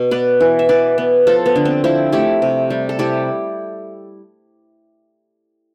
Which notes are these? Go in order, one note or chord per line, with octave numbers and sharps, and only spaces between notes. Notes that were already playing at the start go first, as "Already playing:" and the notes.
Already playing: B2
B3 B4 D5
E3
E5
E3 B4 D5
B3
F3 F4 A4
B3
D3
C4
F3 C4 E4
A3 E4 G4
C3
G3
A4
C3 E4 G4